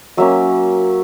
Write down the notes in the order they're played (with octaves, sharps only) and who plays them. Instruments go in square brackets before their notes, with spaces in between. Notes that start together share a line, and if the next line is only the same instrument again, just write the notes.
[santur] F#3 A#3 C#4 E5